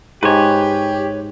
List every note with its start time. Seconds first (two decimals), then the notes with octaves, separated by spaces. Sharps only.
0.23 G#2 G4 B4 C#5